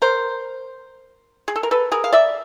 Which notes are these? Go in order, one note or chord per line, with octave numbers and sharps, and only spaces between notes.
A#4 C5
G#4
A4
A#4
A4 B4
G#4 A#4
F5
D5 E5